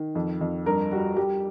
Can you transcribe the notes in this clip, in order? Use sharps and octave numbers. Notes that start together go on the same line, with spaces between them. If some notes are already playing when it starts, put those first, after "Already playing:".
Already playing: D#3
F2
F2
G2 A#4
G3 F#4
G3 G4